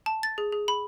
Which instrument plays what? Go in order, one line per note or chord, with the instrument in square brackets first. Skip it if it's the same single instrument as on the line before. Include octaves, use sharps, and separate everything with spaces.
[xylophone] A5
A6
G#4
G#4
B5